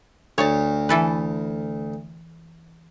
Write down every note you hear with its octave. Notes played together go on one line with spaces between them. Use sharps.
D2 C#5 A5
E3 A4 B4